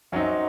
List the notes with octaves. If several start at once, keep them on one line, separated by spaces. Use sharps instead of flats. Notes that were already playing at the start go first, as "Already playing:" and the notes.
F#2 F#3 C4 D#4